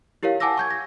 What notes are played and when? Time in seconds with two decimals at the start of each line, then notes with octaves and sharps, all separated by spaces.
0.23 E4 G4 A#4 C#5 F5
0.40 F#5 G#5 A5 D6 E6 A#6
0.58 C#6 G6 G#6
0.70 A#6